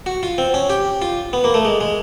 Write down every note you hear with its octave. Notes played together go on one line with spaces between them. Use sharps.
F#4
F4
C4
C#4
G4
F4
B3
A#3
A3
G#3
G#3